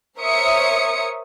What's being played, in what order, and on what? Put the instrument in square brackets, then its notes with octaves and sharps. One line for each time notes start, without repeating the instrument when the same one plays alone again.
[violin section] A#4 C5 C#5 E5 D#6 C#7